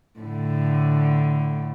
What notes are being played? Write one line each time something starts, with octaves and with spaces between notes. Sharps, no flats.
A2 D3